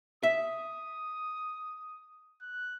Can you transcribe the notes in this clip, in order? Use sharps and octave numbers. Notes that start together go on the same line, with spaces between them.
E5 D#6
F#6